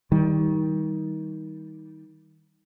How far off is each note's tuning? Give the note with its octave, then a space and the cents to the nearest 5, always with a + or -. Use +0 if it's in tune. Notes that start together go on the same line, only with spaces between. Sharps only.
D#3 +25 G3 -5